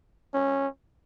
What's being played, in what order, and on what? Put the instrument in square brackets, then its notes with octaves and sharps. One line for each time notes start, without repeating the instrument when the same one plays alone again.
[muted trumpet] C#4